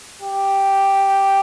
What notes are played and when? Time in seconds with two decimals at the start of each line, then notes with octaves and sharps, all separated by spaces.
0.22 G4